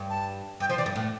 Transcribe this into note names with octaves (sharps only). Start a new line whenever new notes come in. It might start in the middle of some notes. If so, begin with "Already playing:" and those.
Already playing: G2
A5
G2 G5
F3 C5
E3 D5
G2
A2